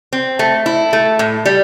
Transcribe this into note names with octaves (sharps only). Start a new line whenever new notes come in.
C4
A3
E4
A3
A2
G3